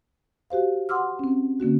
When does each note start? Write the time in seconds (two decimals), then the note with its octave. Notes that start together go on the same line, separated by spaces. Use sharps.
0.50 F#4 G4 C5 F5
0.89 F#5 C6 D6 E6 F6
1.19 C4 C#4
1.60 D3 A#3 C#4 F#4